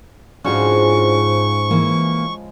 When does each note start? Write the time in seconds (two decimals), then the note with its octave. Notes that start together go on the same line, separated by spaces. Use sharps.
0.44 G#2 C#3 F3 G#3 D4 F#4 G#4 C#6
1.69 E3 A#3 B4